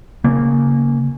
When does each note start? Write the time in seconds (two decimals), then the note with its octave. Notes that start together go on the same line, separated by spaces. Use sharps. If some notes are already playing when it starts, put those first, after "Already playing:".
0.24 C#3 A#3